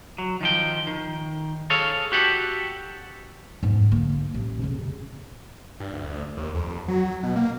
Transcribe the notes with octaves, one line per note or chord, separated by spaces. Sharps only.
F#3
D#3 F3 G5
D#3
G#4 A4 C#5 F5
F#4 G4 A4 F#5
G#2 B3
D3 A#3
A1
F2 C#3
G2
D2
D#2
F2
F#3
B2
A#3